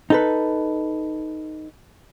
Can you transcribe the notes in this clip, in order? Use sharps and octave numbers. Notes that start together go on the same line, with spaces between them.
D#4 A4 B4